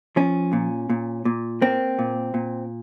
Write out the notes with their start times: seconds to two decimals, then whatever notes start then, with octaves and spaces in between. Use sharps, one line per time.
0.16 F3 C#4
0.53 A#2
0.90 A#2
1.25 A#2
1.62 A#3 C4
1.99 A#2
2.34 A#2